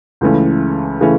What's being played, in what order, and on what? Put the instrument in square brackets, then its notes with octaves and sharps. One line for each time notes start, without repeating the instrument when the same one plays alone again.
[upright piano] C#2 C#3 E3 A3 C#4
C#3 E3 A3 C#4